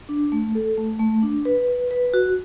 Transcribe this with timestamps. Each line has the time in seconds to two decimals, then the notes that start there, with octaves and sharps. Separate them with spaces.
0.09 D4
0.32 A3
0.55 A4
0.78 A3
1.00 A3
1.22 D4
1.45 B4
1.68 B4
1.91 B4
2.14 F#4